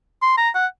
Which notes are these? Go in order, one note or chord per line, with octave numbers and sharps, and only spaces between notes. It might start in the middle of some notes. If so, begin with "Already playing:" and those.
C6
A#5
F#5